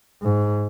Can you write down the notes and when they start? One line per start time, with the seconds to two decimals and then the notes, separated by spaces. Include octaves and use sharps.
0.22 G#2